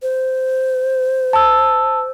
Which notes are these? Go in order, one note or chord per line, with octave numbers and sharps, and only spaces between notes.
C5
A5 E6